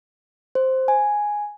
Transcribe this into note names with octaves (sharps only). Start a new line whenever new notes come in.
C5
G#5